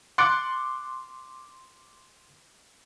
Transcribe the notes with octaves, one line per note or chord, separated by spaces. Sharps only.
C6 D6 F#6 A6 C#7 D7